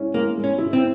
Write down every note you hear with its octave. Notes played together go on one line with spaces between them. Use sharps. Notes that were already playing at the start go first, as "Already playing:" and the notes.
Already playing: G#3 C#4 E4
G#3 A#3
G#3
C#4
E4
C4